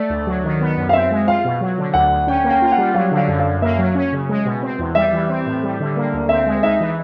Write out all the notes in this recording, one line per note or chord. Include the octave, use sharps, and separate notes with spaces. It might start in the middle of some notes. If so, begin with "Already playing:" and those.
Already playing: A3 D5
D2
F#3
D#3
B3
F#2
F5
C4 E5
G#3
F4 F5
B2
F#3
D3
D2 F#5
D2
C#4 G5
A#3
G5
F4
F#5
G3
F#3 F5
D3
F5
F#2
F5
F#2
A#3 E5
F#3
C#4
C#3
G#3
B2
C4
E2
G3 E5
E3
C4
A2
G3
D3
A#3
D2
C4 E5
G#3
D#4 E5
E3